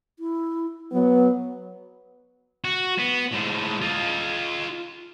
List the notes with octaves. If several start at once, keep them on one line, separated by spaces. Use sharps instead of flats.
E4
F#3 B3
F#4
B3
A2 G#3
F4 D#5